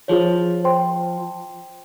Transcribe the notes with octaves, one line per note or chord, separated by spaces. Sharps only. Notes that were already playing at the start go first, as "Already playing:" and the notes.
F3 F4 G#4 C#5
C5 G5 C6